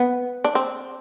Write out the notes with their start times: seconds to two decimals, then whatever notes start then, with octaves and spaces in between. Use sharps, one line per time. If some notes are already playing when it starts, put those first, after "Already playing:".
Already playing: B3
0.44 D4
0.55 C4